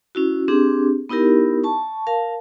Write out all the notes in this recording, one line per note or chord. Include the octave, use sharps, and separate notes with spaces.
C#4 E4 F#4
C4 D4 G4 G#4
B3 D#4 E4 G4 A#4
A5 C#6
A#4 F5 A5